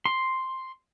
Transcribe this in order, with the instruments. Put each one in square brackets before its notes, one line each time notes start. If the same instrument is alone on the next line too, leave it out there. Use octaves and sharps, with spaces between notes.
[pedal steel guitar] C6